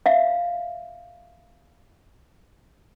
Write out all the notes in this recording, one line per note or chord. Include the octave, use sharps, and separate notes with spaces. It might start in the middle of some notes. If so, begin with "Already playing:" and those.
E5 F5